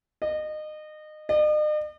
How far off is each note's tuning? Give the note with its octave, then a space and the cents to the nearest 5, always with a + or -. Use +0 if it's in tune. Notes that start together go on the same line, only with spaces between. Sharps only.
D#5 -25
D#5 -45